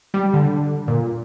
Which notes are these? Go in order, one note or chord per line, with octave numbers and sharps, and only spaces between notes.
G3
D3
A#2